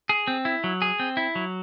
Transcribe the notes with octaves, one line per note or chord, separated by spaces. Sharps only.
G#4
C4
E4
F#3
G#4
C4
E4
F#3